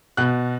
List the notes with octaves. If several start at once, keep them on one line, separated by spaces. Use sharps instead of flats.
B2 F#6